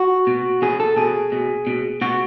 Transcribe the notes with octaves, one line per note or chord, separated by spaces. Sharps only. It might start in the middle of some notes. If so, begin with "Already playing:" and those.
Already playing: F#4
B2
B2 G#4
A4
B2 G#4
B2
B2
B2 F#4